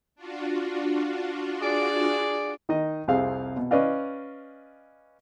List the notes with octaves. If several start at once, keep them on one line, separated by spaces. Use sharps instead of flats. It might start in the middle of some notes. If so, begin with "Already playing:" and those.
D4 F4 F#4
G#4 D5
D#3 D#4 D#5
C2 F2 C3 C4 G#4 F5
B2
C#4 B4 D5 D#5 F5